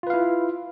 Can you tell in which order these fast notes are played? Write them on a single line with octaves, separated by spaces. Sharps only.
F4 B4 F5 E4